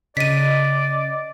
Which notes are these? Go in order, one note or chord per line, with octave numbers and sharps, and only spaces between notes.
C#3 D5 D#5 B6 D#7